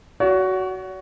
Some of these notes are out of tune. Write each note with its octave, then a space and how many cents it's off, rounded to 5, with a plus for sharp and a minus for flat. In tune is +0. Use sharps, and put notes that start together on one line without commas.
F#4 +10 C#5 +45